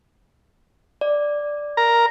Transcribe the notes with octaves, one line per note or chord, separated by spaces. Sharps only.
D5
A#4 A#5